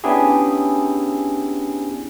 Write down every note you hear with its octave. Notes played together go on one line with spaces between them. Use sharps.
B3 C#4 D4 E4 G4 G#4